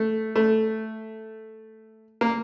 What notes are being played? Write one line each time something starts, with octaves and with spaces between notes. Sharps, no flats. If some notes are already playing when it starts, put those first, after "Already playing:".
Already playing: A3
A3
A#3